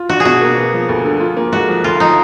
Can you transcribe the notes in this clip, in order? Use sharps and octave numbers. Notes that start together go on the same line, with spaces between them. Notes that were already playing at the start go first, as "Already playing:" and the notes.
Already playing: F4
D4 F#4
G#4
B2 F#4
A#3
B3
F3
D2
D3
F4
A#3
G#2 F#4
F3
D2 F4
F3 D#4